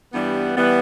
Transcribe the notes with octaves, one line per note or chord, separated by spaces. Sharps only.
G2 E3 G3 B3
E3 G3 B3